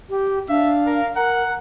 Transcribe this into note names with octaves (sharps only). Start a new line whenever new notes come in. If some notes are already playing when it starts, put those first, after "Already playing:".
G4
D4 E5 F5
A#4
A#4 F#5 A#5